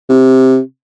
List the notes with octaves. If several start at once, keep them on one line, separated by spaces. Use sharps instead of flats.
C3